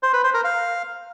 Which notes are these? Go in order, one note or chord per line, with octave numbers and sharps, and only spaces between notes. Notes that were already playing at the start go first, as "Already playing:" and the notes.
C5
B4
C5
A#4
F5